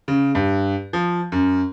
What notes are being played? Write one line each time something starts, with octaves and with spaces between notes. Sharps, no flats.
C#3
G2
F3
F#2